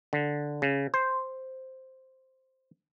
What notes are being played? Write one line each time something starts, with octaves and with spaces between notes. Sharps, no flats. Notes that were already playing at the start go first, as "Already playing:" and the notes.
D3
C#3
C5